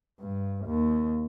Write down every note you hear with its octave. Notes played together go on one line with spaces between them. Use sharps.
G2
D#2